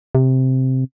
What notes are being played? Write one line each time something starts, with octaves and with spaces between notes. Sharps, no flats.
C3